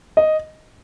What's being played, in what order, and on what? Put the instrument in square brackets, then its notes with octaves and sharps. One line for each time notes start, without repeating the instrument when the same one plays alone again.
[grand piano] D#5